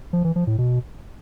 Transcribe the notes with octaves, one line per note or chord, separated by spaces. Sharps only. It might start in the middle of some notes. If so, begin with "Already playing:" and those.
F3
E3
F3
A2
B2